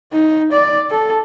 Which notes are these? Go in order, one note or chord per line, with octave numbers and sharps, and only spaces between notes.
D#4
D5
A4